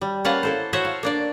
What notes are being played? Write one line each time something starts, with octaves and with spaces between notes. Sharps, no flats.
G3
A#3 C#4 B4 F5 F#5 A5
E4 A4 C5
F#4 C5 C#5 E5 F#5
F5
A#3 D4 D5